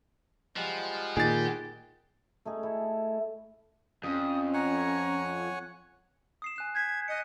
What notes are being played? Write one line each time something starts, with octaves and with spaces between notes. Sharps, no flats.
F3 G3 G#3 F#5
A#2 D#3 G4 G#4 A6
A3 D#4 G#4
E4 A4
F2 C#4 D#6
C#5 F#5 G#5 A#5
D#6 C7 E7
G#5 F#6 E7
G6 G#6 B6
D#5 F#6 C#7